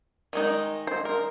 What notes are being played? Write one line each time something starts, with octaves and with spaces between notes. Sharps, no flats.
D#3 G#3 D#4
C5
A#4